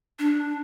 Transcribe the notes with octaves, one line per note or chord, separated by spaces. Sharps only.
D4